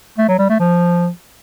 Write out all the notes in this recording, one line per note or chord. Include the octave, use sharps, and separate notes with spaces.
A3
F#3
G3
A3
F3